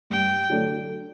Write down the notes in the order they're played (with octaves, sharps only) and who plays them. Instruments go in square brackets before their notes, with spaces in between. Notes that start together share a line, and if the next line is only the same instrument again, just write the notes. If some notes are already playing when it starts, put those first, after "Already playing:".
[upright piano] G2 [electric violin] G5
[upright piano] D3 F#3 A3 D4